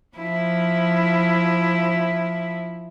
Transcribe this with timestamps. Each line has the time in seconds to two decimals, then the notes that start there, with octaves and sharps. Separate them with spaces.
0.17 F3 E4